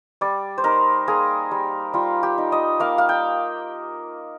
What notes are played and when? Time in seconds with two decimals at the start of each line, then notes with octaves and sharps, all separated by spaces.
0.21 G3 D5
0.58 C5
0.64 D#4 A#4
1.08 A#3 G#4
1.51 G3
1.93 G3 F4
2.23 G4
2.38 D#4
2.52 D#5
2.80 A#3 F5
2.98 F5
3.09 G5